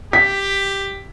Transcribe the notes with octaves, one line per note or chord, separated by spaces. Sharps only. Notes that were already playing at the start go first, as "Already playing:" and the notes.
G4 B6